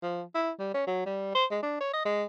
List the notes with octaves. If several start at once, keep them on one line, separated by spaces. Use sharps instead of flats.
F3
E4
G3
C#4
F#3
G3
C5
G#3
D4
C#5
D#5
G#3